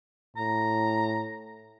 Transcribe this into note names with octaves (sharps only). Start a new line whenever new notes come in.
A2 A#5